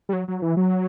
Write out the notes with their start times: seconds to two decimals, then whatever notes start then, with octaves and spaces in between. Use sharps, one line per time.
0.09 G3
0.13 F#3
0.28 F#3
0.42 E3
0.57 F#3